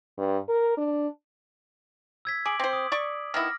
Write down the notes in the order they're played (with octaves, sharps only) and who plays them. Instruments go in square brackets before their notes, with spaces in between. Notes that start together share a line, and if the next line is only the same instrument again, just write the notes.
[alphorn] G2
A#4
D4
[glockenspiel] E6 G#6 B6
[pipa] G#4 [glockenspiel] D6 D7 F#7
[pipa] C4 C5
[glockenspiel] D#6
[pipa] D5 C#6
[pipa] D#3 B3 E4 [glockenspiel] F6 A#6